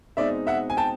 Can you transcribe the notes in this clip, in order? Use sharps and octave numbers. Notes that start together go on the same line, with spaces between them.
B2 G#3 C4 D#4 D5 E5
E5 F#5
G#5
G5 A5